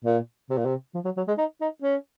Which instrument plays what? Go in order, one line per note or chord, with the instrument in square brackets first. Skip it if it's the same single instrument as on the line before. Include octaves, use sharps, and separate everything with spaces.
[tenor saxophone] A#2
C3
A#2
C3
F3
F#3
F#3
G#3
D#4
D#4
C#4